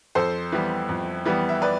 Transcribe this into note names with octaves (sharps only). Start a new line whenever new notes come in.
F2 A4 C5
E3 G3 B3
F2
E3 G3 B3
E5
B4 D5